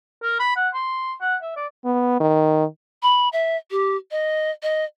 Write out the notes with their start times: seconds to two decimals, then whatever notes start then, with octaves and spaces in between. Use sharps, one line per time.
0.22 A#4
0.40 B5
0.56 F#5
0.74 C6
1.21 F#5
1.42 E5
1.56 D5
1.85 B3
2.20 D#3
3.03 B5
3.33 E5
3.71 G4
4.11 D#5
4.63 D#5